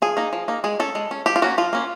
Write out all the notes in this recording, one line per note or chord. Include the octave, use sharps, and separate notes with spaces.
F3 G#4
A#3 D#4
F3
A#3 D#4
G#3 G#4
C#4 A4
G#3
C#4
F3 G4
F4
A#3 C#4 F#4
F3 F4
A#3 C#4